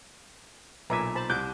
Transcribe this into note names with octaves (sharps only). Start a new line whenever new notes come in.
B1 A#2 B4 E5 G#5 A#5 D6
C5 A5 B5
C2 D6 F#6 G6